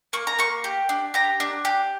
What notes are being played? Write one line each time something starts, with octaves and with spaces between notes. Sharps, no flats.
A#3 C#6
A#5
A#3 C#6
G4
D4
G4 A#5
D4
G4